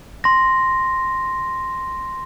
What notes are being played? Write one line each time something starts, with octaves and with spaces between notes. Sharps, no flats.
C6 A#6